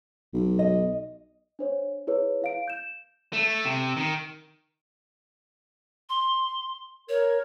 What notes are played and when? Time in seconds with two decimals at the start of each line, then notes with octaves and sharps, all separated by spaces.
0.34 B1
0.59 D#5
1.59 D4 C5 C#5
2.07 E4 G#4 B4 C#5
2.42 E4 F5 D7
2.68 G6 E7
3.33 A3
3.65 C3
3.97 D#3
6.09 C6
7.09 A#4 C#5